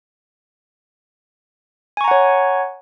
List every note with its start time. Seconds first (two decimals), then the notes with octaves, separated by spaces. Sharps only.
1.97 G#5
2.01 C#6
2.04 A#5
2.08 F#5
2.11 C#5